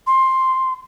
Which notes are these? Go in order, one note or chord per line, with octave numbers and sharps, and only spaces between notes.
C6